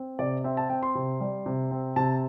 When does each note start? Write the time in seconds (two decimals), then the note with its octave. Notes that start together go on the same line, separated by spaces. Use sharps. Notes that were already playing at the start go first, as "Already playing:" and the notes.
Already playing: C4
0.19 C3 D5
0.44 C4 E5
0.57 A5
0.70 C4 G5
0.83 C6
0.95 C3
1.20 G3
1.46 C3
1.71 C4
1.96 C3 A5